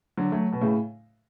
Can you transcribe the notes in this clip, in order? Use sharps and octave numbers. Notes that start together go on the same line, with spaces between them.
D3 F#3
F#3 A3
B2
A2 C#3